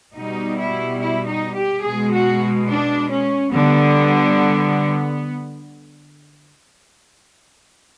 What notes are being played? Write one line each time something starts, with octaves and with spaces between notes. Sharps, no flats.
B2 G3 D#4
E4
E4
D#4
G4
B2 G#3 G#4
F#4
D4
C#4
D3 G3 B3